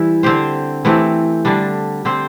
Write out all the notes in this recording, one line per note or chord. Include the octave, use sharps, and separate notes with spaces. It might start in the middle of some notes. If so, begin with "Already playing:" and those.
Already playing: E3 G3 E4
D3 C4 G4 C5
E3 A3 C4 G4
D3 G3 D4
D3 C4 G4 C5